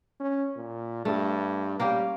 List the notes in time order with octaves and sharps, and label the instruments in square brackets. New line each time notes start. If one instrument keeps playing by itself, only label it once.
[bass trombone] C#4
A#2
[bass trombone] G2 [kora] A3
[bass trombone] G3 [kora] A#3 C#4 G4